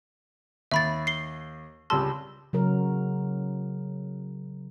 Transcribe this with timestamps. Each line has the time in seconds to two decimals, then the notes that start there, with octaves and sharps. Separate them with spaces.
0.71 D#2 E5 B5 A6
1.07 C7 G7
1.90 C#2 G3 A5 C6 E6
2.53 C#3 F#3 A#4